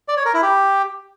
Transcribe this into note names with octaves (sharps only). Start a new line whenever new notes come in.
D5
C#5
A#4
E4
G4